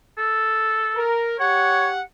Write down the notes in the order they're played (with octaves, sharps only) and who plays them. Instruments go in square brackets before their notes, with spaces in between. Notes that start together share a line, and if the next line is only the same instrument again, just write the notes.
[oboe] A4
[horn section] A#4
[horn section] G4 F#5 [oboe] C#5